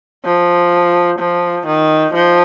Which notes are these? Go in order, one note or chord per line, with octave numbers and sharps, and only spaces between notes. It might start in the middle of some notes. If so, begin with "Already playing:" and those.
F3
F3
D#3
F3